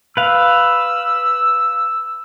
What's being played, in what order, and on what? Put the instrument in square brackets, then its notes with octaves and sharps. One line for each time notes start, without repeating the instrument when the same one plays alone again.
[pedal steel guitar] B4 F5 [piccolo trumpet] E6